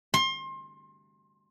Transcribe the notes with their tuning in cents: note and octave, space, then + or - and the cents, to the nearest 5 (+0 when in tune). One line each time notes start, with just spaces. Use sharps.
C6 +30